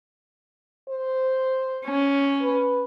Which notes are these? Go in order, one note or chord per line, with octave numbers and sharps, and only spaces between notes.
C5
C#4
B4